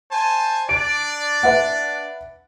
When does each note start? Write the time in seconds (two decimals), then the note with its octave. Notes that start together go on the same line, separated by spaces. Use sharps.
0.11 C5 G#5 A5
0.69 D4 D5 D7
1.43 B4 E5 F#5